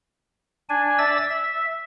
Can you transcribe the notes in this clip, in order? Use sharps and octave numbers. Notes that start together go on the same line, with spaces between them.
D4 G#5
D5 E5 E6 A6
E5